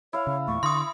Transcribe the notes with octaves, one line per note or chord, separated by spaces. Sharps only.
E4 C#5 F5
C#3
E2 A#2 A3 C#6
D3 E4 C6 D#6